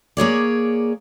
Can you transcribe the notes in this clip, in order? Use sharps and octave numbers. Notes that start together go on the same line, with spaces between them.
A#3 G#4 C#5 D5